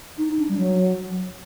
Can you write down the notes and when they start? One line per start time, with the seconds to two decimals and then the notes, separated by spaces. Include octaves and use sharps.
0.18 D#4
0.29 D#4
0.39 D4
0.49 G3
0.58 F#3